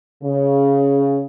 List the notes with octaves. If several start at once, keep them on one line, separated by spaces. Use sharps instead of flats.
C#3